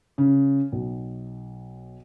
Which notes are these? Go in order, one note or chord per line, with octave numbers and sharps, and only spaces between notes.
C#3
B1